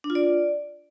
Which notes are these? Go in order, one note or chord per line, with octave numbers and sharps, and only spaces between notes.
D4
F4
D5